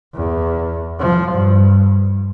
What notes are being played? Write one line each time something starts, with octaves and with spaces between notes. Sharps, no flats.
E2
F3
G2